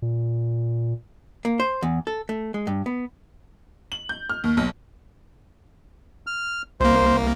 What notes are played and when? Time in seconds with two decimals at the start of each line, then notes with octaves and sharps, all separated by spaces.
0.02 A#2
1.45 A#3
1.60 C5
1.83 E2
2.07 A4
2.29 A3
2.54 G#3
2.67 G2
2.86 B3
3.92 F#7
4.09 G6
4.30 F6
4.44 D#2
4.57 B1
6.27 F6
6.80 C2 A#3 C5